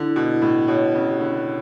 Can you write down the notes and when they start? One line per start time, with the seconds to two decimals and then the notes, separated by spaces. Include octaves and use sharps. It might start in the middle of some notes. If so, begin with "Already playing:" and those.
Already playing: D3 E4
0.16 B2
0.29 E4
0.42 A2
0.68 B2 C#5
0.95 C#3
1.08 G4
1.20 D3